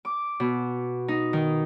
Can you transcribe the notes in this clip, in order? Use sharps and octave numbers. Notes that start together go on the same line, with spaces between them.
D6
B2
D#4
D#3